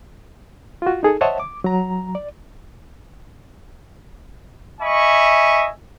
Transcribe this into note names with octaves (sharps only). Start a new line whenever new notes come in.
F4 F#4
D#4 G#4 A4
C5 C#5 D#5 E5 F#5 A5
D6
F#3 A#5
D5
D#5 E5 G#5 B5 C#6